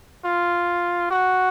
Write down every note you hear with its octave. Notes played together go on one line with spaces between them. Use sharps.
F4
F#4